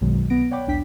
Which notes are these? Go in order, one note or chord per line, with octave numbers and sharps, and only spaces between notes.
B1 F#2 B2 D#3 F#3 G#3
C2 B3 A#6 D7
C#5 D5 F#5 G5 B5 D6
B1 E2 D4 G5 B6